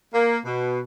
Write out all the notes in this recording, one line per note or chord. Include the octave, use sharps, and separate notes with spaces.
A#3
B2